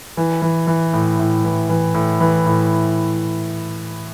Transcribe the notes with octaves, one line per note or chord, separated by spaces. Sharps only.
E3
E3
E3
A2
A2
E3
E3
A2
E3
A2